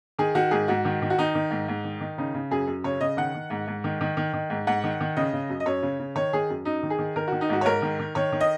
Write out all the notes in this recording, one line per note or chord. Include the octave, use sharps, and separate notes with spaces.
D#3 G#4
D#3 F#4
G#2 G#4
G#2 F#4
D#3
D#3
F#4
D#3 D#4
D#3
G#2
G#2
D#3
D#3
C#3 D#4
C#3
F#2 G#4
F#2
C#3 C#5
C#3 D#5
D#3 F#5
D#3
G#2
G#2
D#3
D#3
D#3
D#3
G#2
G#2 F#5
D#3
D#3
C#3 D#5
C#3
F#2
D#5
F#2 C#5
C#3
C#3
D#3 C#5
D#3 G#4
F#2
F#2 D#4
D#3
G#4
D#3
D#3 A#4
D#3 F#4
D#4
G#2 F#4
C#5
G#2 A#4
D#3
D#3
D#3 C#5
D#3
D#5